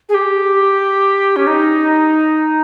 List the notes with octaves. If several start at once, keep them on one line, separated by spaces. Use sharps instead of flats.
G#4
G4
C#4
D#4